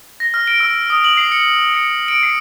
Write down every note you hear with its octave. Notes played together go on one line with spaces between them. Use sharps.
A#6
F6
D7
E6
D#6
F#7
C7
C#7
C#7
D7
C7